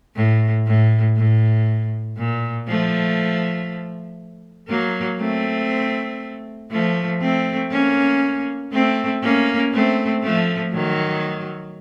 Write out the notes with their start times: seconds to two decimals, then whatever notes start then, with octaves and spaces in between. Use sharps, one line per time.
0.15 A2
0.66 A2
1.16 A2
2.17 A#2
2.68 F3 A3
4.68 F#3 A#3
5.19 A3 C4
6.71 F3 A3
7.21 A3 C4
7.71 A#3 C#4
8.72 A3 C4
9.22 A#3 C#4
9.73 A3 C4
10.23 F3 A3
10.73 D#3 F#3